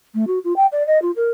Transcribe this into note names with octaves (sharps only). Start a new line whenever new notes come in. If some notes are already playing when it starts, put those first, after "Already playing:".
A3
F#4
F4
G5
D5
D#5
F4
A#4